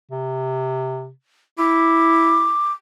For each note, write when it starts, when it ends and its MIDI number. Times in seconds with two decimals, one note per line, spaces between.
0.11 1.11 48
1.59 2.53 64
1.59 2.72 86